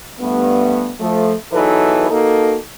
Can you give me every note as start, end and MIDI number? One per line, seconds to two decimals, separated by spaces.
0.20 0.92 43
0.20 0.92 57
0.20 0.92 59
0.99 1.33 53
0.99 1.33 57
1.52 2.07 40
1.52 2.07 52
1.52 2.07 54
1.52 2.07 63
1.52 2.07 69
1.52 2.07 71
2.10 2.57 58
2.10 2.57 63
2.10 2.57 66
2.10 2.57 69